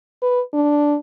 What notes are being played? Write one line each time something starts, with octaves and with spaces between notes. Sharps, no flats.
B4
D4